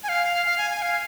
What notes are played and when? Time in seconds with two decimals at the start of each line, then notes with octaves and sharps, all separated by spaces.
0.03 G#5
0.09 F5
0.46 F5
0.58 G#5
0.70 G#5
0.82 F5